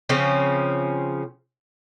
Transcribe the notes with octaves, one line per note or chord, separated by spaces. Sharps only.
C#3 F3 C4 C#4